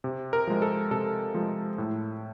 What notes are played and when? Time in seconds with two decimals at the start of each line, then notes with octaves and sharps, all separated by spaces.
0.04 C3
0.33 A#4
0.47 F3 G#3
0.62 A4
0.91 C3 A4
1.34 F3 G#3
1.78 A2